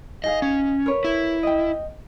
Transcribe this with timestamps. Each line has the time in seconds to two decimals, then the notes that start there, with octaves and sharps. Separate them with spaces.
0.24 D#4 G#4 D#5 F5
0.42 C#4
0.86 A#4 B4 C#5
1.04 E4
1.43 D#5 G5